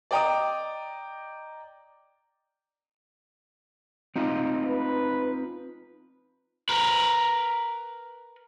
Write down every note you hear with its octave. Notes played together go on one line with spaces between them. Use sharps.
D5 D#5 G5 A#5 D6 D#6
C4 D#4 F4
B4
A#4 B4